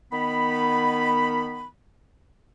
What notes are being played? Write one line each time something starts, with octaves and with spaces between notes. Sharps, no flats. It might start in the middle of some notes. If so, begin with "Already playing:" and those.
D#3 B3 B5